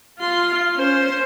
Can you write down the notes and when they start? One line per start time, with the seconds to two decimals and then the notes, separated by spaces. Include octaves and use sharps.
0.19 F4 C6
0.75 C#4 C5